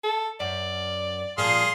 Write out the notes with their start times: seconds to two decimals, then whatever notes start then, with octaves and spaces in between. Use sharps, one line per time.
0.04 A4
0.40 F#2 D5
1.38 A#2 F3 G3 G#4 F5 C6